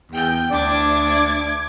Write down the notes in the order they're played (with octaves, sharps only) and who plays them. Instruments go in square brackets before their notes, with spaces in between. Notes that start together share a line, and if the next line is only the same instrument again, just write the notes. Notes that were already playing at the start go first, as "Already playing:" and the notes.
[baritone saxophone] E2 [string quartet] G5 G6
[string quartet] D2 D6 G#6 [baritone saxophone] D4 [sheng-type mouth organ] D5